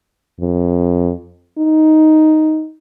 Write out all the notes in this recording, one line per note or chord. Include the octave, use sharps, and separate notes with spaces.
F2
D#4